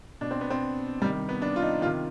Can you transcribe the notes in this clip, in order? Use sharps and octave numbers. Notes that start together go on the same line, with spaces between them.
B2 D4
C4
B3
C4
C3 D#3 G3
B3
D4
F4
D#4
C3 D#3 F4